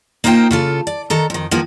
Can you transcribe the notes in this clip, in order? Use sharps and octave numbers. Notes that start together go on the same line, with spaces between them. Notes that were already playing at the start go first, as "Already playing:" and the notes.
A#3 D#4 F4 C5 G5
C#3 F4 A4
D5
D#3 A4 A#5
F2 D#3
D#3 F3 A#3 B3